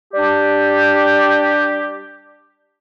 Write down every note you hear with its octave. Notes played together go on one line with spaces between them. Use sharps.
G3 D4 G4